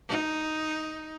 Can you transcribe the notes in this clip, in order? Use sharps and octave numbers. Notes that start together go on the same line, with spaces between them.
D#4